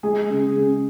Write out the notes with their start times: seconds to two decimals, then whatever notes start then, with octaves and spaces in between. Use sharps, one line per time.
0.03 G#3 G#4
0.30 C#3
0.56 C#3